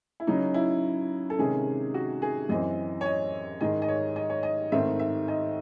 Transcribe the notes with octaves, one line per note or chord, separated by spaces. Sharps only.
E4
C#3 F#3 C#4 D#4
E4
A4
C3 D#3 G#3 C#4 G#4
F#4
G#4
F#2 E3 C4 D#5
C#5
D#5
G#2 D#3 G#3 D#5
D#5
C#5
D#5
C#5
D#5
G#2 D#3 A3 C4 E5
E5
D#5